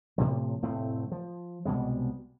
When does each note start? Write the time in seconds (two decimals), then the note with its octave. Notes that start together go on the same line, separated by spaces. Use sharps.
0.18 A2 C3 F3
0.62 F1 A2 A3 C4
1.12 F3
1.65 C2 B2 G3 G#3